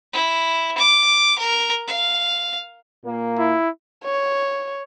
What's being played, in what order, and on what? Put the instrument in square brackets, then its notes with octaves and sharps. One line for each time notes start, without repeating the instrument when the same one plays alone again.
[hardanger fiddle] E4
D6
A#4
F5
[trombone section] A#2 A#3
[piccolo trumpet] E4
[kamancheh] C#5